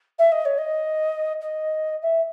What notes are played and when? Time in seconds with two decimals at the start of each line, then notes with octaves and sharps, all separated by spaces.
0.19 E5
0.32 D#5
0.45 C#5
0.58 D#5
1.41 D#5
2.02 E5